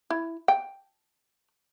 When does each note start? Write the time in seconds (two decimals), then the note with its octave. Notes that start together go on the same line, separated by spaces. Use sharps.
0.10 E4
0.48 G5